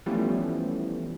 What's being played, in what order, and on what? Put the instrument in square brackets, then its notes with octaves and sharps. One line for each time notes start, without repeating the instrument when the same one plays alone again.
[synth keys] E3 F3 G3 A3 B3 C#4